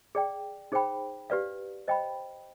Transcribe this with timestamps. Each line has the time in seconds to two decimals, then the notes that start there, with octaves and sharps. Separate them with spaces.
0.15 G#4 D5 G5
0.72 D#4 G#4 C5 G5 B5
1.30 G4 B4 D5 F5
1.88 C5 D#5 G5 B5